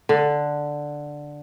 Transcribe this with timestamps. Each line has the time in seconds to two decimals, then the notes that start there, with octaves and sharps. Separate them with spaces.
0.09 D3